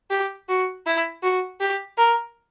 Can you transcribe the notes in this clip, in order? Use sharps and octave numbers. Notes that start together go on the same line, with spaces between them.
G4
F#4
E4
F#4
G4
A#4